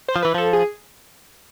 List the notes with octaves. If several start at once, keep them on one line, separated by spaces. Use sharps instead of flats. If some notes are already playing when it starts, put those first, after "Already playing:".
C5
F3
E3 B4
F3 A4
G#4